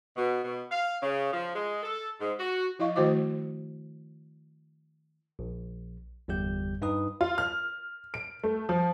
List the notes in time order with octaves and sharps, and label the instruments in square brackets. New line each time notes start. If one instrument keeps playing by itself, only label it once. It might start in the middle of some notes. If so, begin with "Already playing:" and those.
[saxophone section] B2
B2
F5
C#3
F3
G#3
A4
G#2
F#4
[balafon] F3 E4 D#5 F5 C#6
D#3 A3 F#4 C5 D#5 D6
[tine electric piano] A#1
G1 E2 G3 G4 G6
G2 D#4 B4 D#6
[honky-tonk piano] F4
F6
D7
A3
F3